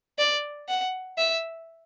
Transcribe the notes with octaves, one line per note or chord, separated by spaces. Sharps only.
D5
F#5
E5